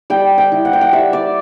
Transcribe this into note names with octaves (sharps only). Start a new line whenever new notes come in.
G3 G5
G5
E4
F#5
G5
F#5
G3 E5
D5